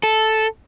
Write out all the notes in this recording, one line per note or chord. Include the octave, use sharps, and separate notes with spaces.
A4